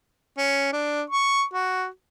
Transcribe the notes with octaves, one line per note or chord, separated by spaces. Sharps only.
C#4
D4
C#6
F#4